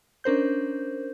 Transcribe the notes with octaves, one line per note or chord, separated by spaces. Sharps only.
C#4 D4 A#4 C5 G6